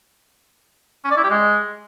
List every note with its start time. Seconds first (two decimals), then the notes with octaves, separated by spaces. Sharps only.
1.04 C#4
1.11 D5
1.17 E4
1.23 G4
1.30 G#3